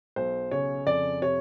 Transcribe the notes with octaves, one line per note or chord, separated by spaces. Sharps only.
B1 C5
C#3 C#5
F2 D5
C3 C#5